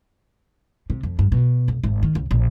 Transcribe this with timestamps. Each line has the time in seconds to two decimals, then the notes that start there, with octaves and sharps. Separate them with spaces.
0.90 C3
1.03 F2
1.19 G2
1.32 B2
1.68 F1
1.83 G#1
2.03 D#3
2.15 C#2
2.31 A#1